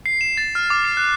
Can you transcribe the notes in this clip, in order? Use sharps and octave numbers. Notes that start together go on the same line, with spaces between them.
C7
E7
A6
F6
D6
C7
F#6